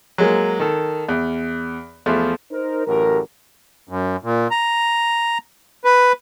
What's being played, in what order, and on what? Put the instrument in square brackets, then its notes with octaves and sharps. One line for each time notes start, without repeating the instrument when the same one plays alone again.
[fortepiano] F#3 G#3 A#3
D#3 A4
E2
E2 F3 A3
[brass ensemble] D#4 A#4 C5
A1 F#2 G4 A4 A#4
[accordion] F#2
A#2
A#5
B4